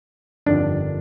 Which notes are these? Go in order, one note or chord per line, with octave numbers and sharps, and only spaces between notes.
G1 F2 D#3 G3 D4